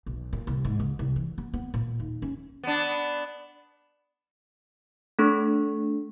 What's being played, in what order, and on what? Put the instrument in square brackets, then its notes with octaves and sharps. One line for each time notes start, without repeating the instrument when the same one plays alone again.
[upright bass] B1
A#2
C2
G#2
C#2
C2
E3
B3
B3
A#2
D#2
C#4
[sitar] B3 D4
[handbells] A3 D4 A4 C#6